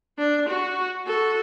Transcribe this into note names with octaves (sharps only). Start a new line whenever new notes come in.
D4
F#4
F#4 A4